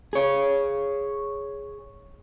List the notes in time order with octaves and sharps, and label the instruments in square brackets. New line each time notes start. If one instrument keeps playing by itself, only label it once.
[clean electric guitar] G#4 C#5